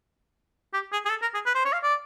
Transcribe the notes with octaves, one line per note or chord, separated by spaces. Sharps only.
G4
G#4
G#4
A4
A#4
G#4
B4
C5
C#5
F5
D5